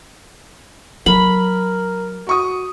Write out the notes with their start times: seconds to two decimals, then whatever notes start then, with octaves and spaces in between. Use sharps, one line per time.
1.06 F#3 A#4 B5
2.27 F#4 C#6 D#6